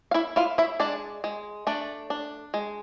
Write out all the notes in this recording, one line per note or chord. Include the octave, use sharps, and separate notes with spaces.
F5
E4 E5
E4 F4 F5
E4 E5
G#3 D4 D5
G#3
A3 D4 D5
D4
G#3